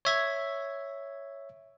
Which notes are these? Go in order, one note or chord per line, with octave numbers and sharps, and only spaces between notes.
C#5 E5 G#6